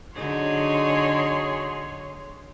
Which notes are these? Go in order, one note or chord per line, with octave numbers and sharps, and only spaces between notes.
D3 F#3 D#4 G#4 C#5 C6